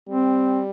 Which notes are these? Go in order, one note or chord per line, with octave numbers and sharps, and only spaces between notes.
G3 C4